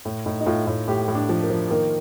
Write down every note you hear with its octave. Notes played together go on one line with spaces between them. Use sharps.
A2
A2 D#4
D#4
A2 F4
A2
A2 G4
A2
D4
F3
A#3
F3
D#3 A#3